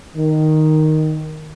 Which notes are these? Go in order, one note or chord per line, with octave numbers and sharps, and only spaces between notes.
D#3